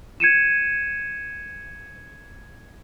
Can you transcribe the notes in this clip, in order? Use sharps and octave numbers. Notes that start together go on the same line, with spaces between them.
G#6 C#7 D#7 E7